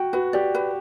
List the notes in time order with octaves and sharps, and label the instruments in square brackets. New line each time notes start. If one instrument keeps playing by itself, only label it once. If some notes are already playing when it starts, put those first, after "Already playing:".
Already playing: [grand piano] F#4 [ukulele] G5
[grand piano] F#4 [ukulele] B4
[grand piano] G4 [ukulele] D5
[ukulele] B4